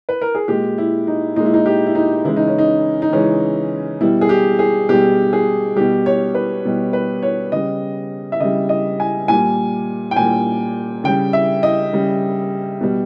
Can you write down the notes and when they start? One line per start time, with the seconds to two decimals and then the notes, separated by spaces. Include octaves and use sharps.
0.09 B4
0.22 A#4
0.35 G#4
0.48 A#2 G#3 G4
0.78 E4
1.07 D#4
1.36 A#2 G#3 D#4
1.46 E4
1.54 D#4
1.66 G4
1.86 E4
1.95 D#4
2.24 C#3 E3 G#3 E4
2.36 D#4
2.47 C#4
2.58 D#4
3.02 D#4
3.12 C#3 E3 G#3 C#4
4.00 B2 G3 E4
4.21 G#4
4.29 G4
4.59 G#4
4.89 B2 G3 G4
5.33 G#4
5.76 G3 G4
5.80 B2
6.06 C#5
6.35 B4
6.65 B2 G3
6.93 B4
7.23 C#5
7.52 C#3 G3 D#5
8.32 E5
8.40 C#3 G3 D#5
8.69 D#5
9.00 G#5
9.28 A#2 G3 G#5
10.11 G5
10.16 A#2 G3 G#5
11.04 C#3 G3 G5
11.33 E5
11.63 D#5
11.93 C#3 G3
12.81 B2 G3